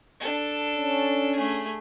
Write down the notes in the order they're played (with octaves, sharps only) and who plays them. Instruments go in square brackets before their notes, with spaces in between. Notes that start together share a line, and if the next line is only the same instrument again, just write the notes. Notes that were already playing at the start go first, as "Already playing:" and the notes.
[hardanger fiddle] D4 A4
[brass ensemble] C#4
[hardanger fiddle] A3 G#4